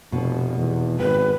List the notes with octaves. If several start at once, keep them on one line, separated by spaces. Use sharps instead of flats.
F1 B2
E2
G#1 B4 G5